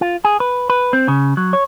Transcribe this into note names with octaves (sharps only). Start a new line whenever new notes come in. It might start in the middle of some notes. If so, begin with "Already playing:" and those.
F4
G#4
B4
B4
C4
C#3
F#3
C#5